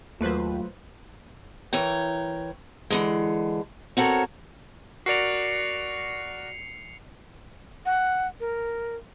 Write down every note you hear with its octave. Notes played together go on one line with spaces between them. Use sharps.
D#2 F#3 A3 A#3 F4 B4 C5
E3 A#4 C#5 G5
D3 E3 G#3
C4 F#4 A4 A#4 C#5
F#4 A#4 D5 C7 C#7 F7
F#5
A#4